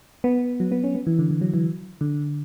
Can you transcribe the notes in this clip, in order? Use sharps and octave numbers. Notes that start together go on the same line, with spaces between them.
B3
F#3
B3
C#4
B3
E3
D3
E3
F#3
E3
D3